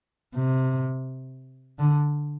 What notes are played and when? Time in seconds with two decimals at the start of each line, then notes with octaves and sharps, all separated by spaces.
0.34 C3
1.79 D3